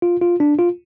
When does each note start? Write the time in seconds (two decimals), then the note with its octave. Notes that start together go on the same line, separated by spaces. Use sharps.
0.02 F4
0.22 F4
0.40 D4
0.59 F4